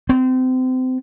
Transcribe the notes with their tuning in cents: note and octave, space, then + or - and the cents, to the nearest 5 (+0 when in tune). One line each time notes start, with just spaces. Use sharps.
C4 -30